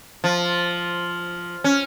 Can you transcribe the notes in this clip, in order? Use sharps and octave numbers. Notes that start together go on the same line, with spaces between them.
F3
C#4